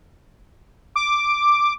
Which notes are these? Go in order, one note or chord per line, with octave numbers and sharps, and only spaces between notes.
D6